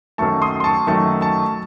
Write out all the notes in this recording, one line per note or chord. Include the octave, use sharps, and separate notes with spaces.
F#2 D#3 F#3 A3 A5 C#6
C6 D#6
C6
A5 C#6
F#2 D#3 F#3 A3 A5 C#6
A5 C#6